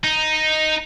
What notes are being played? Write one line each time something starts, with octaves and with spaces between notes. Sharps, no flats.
D#4